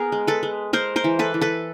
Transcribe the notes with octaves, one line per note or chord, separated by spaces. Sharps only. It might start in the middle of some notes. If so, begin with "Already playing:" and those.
Already playing: B3 G#4 A#4
G#3
A4 B4
G#3
G#3 A#4 C5
A#4 C5
E3
A4 B4
E3
A4 B4